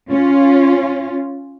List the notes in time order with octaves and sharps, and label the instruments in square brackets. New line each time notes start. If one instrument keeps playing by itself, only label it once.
[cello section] C#4 F4